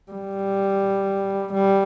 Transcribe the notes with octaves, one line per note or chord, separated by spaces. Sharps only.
G3
G3